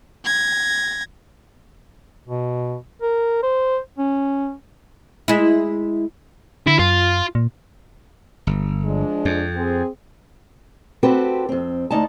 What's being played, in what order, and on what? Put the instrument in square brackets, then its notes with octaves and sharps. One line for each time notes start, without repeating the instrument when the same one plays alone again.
[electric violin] G#6 A#6
[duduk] B2
A#4
C5
C#4
[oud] G#3 E4
[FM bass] D3 [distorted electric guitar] E4
[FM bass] F#2 [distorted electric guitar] F4
[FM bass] A#2
[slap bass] G1
[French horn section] F3 G#3 D4
[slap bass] F2
[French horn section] C4 G#4
[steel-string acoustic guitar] C4 F#4 G4 A4 B4
F2 C4
D2 D#4 D5 A5